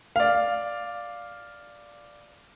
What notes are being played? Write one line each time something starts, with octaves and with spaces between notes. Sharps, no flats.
D5 F5